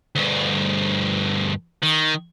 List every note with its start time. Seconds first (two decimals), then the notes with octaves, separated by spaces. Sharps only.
0.15 D2 G2
1.83 D#3